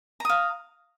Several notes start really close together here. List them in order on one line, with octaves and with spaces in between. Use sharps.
A#5 D#6 F5